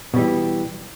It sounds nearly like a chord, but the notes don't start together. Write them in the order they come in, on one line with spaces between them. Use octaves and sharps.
B2 G3 E3